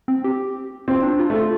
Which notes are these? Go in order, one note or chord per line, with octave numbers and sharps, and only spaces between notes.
C4
G4
C4 F4
D4
F4
A3
F4